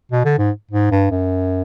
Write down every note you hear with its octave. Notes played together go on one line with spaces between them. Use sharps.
B2
D3
G#2
G#2
G2
F#2